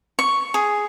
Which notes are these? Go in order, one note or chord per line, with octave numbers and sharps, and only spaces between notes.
C#6
G#4